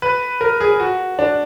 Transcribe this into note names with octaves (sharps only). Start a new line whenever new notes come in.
B4
A#4
G#4
F#4
D4